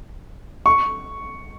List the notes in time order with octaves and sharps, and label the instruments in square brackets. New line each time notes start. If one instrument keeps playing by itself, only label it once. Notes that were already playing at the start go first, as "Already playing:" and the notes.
[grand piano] C#6